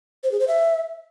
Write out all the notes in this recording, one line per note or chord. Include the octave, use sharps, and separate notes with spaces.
C5
G#4
C5
E5